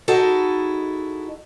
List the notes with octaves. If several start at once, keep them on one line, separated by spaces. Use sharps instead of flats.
D#4 E4 F#4 G#4 A4 D#5